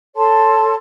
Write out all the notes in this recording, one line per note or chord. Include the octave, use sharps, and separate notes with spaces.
A4 C#5 A5 C6